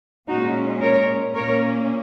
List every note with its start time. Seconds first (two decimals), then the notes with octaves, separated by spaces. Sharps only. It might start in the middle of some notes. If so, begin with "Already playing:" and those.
0.28 A#2 G#3 C#4 D#4 F#4
0.81 A#4 C#5
1.34 A#2 A#3 C#4 A#4 C#5